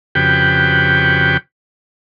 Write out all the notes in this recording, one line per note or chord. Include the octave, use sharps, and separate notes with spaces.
F2 C#3 F#4 G4 B4 G5